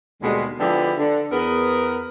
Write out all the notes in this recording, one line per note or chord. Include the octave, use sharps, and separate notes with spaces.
D#2 B2 D3 G3 G#3
D3 F3 G#3 B3 E4 G4
D3
E2 B3 A#4